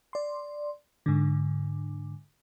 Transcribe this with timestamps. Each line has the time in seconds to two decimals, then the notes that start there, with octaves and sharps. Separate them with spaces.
0.13 D5 C6
1.06 G#2 D3